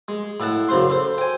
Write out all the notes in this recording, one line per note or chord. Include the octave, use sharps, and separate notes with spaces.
G#3
A2 A4 F#5 A5
F#2 C#3 C5 C6
A4 C5
G5 G#5